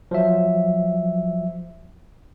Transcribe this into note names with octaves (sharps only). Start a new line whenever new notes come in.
F3 F#3 E5